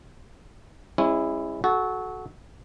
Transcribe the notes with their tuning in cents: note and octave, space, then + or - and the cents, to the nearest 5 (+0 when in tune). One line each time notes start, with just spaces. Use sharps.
G#3 -30 C#4 -30 E4 +0
F#4 +0 A4 -30